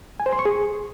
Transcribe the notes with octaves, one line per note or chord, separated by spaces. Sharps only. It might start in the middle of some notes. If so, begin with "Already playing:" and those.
G#5
C5
C6
C#6
G#4